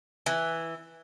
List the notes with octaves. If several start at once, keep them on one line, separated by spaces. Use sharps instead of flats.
E3